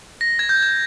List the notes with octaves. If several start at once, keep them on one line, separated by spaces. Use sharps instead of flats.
A#6
G#6
G6
G#6